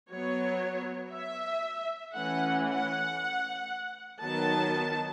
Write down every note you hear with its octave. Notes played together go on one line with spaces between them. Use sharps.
F#3 B3 C#5
E5
E3 A3 C#4 F#5
F#5
D#3 F#3 B3 A5